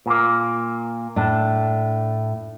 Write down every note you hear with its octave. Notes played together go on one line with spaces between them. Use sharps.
A#2 A#3
A2 D4